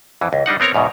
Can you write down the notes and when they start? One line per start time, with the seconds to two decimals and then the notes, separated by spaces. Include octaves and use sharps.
0.21 F2 E3
0.33 C#2
0.46 G3 D4 D#4 F#5
0.60 B3 C4 A#4 C#5 A#5
0.74 E2 G#2 B2